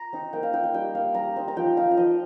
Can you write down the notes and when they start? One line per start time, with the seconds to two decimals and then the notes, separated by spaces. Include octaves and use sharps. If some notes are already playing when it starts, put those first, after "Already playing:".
Already playing: A#5
0.13 C4 D#4
0.33 A#3 G5
0.43 F5
0.53 D#4 G5
0.64 G5
0.74 G3 G5
0.95 A#3 D#4 F5
1.14 G3 A#5
1.36 C4 D#4
1.48 A#5
1.57 F3 G5
1.77 D#4 F5
1.91 F5
1.97 F3 D#5